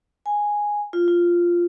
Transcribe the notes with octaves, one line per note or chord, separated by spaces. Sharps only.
G#5
F4
F4